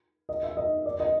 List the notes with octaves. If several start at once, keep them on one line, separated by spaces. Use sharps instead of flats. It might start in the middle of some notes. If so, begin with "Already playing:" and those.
D#5
E5
D#5
D5
D#5